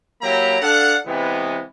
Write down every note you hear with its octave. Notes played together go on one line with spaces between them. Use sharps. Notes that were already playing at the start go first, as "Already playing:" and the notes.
F#3 A#3 E4 G4 A#5
D4 A4 F5 F#5
C3 E3 G#3 B3